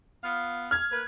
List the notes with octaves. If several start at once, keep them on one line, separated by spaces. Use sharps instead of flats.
B3 F4 F5
F6 G#6
A#3 B4